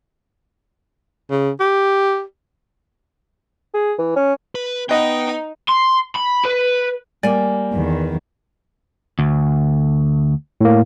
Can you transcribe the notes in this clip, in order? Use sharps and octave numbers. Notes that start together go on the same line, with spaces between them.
C#3
G4
G#4
E3
C#4
B4
B3 D#4 B4 D#5 F#5 G5
C6
B5
B4
G3 A#3 D5 G#5
E2 D#3
D2
A2 A#3